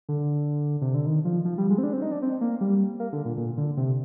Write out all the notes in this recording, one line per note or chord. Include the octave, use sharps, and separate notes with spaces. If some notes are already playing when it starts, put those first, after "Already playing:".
D3
C3
D3
D#3
F3
F3
G3
G#3
C4
D4
C4
D#4
D4
C4
A#3
G3
A#3
D3
A#2
A#2
D3
C3